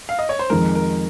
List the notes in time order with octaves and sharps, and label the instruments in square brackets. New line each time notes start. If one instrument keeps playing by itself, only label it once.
[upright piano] F5
D#5
C#5
C5
[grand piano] F2 D#3 G#3 [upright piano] A#4
[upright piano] A#4